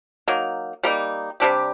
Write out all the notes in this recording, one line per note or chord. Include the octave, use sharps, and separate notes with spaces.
F#3 A#3 D#4
G3 A#3 D#4
C3 G3 D4 G4